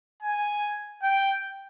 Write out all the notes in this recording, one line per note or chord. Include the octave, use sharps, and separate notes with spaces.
G#5
G5